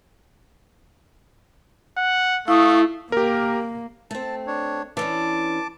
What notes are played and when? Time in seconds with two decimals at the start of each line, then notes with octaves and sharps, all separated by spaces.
1.98 F#5
2.48 A3 E4 F5 C#6 D#6
3.12 A#3 G4 A#4
4.11 A3 C4 A5
4.47 D4 C#5
4.97 E3 C#4 D4 A5 D6